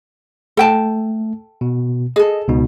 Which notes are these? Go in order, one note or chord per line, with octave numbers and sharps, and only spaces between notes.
A3 A4 G5 A5
B2
G#4 A4 D#5
C#2 B2 D#4